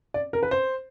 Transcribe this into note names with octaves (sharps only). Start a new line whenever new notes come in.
D5
A#4
B4
C5